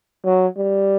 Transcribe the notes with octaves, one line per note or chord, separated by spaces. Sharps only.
F#3
G3